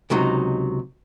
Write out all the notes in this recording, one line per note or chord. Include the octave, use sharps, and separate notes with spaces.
C#2 C3 F#3 D#4